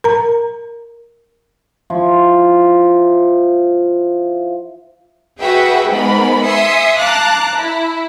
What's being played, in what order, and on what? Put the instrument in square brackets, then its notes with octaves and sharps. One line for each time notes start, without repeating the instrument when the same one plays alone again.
[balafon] A#4 A#5
[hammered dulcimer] F3 E4
[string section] F#4 G#4 B4 E5 F#5 G5
G#2 G#3 B3 A#4 B5
E5 G#5 C6 D#6 C#7
F5 A5 A#5 D6 F#6
E4